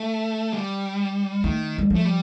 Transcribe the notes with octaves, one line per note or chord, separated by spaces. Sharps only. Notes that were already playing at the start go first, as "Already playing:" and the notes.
Already playing: A3
G3
D#3 A3
G3
F3 A3
G3